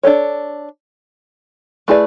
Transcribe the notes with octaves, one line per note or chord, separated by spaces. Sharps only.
D4 A4 C#5
A3 E4 G#4 B4 D5